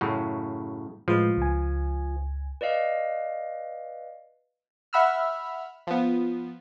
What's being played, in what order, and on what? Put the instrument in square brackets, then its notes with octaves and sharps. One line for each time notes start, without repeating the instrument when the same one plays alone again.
[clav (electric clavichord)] F#2 A2 C#3
[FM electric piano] A2 G#3 B4 [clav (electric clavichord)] F3
[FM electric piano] C#2 G#5
[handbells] B4 D5 D#5 F5
[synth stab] E5 F#5 B5 E6 F6
F3 B3